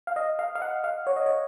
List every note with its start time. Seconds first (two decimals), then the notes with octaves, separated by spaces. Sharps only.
0.07 F5
0.16 D#5
0.39 F5
0.55 F5
0.62 F#5
0.84 F5
1.07 C#5
1.16 D#5
1.26 C#5